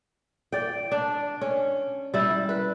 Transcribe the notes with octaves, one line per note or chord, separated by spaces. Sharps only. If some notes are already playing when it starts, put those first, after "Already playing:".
D5 G5
D4
C#4
G3 E4
B4